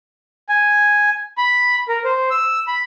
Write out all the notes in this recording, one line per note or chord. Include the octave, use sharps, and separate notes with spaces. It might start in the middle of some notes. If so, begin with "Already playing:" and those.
G#5
B5
A#4
C5
E6
B5